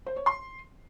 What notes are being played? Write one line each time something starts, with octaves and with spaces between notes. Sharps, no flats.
C5
C#5
C6